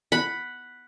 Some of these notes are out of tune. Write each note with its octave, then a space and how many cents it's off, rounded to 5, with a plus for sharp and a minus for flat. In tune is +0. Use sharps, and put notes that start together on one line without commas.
F#5 +0 B5 +0